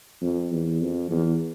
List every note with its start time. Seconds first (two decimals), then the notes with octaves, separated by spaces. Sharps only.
0.21 F2
0.51 E2
0.81 F2
1.10 E2